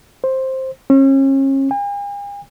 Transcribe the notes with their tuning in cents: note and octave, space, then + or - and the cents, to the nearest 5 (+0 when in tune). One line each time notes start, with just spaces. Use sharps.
C5 +10
C#4 -35
G#5 -45